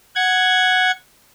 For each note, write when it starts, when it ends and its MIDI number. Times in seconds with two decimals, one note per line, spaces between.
0.16 0.91 78
0.16 0.91 92